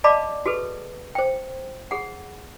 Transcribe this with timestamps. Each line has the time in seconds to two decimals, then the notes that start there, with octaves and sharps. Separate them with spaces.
0.04 D5 D#5 F5 A5 B5 D6
0.46 F#4 G#4 A4 B4
1.15 C5 G5
1.91 G#4 F#5